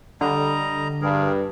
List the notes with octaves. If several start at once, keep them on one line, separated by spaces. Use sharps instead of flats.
D3 G3 D#5 A#5
G2 G#4 A#4